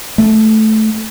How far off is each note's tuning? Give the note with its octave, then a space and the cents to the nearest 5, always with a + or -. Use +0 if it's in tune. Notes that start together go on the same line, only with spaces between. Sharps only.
A3 -10